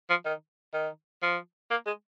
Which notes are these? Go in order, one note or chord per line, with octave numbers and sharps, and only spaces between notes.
F3
D#3
D#3
F3
A#3
G#3